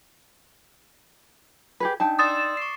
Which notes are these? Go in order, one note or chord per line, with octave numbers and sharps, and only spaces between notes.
G4 G#4 B4
D4 D#4 G5 A5
D5 C6 D#6 E6 A6 E7
C#6 D6 C7